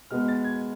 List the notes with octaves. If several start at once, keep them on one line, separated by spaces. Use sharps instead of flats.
B2 G#3 B3 F6
A6
G#6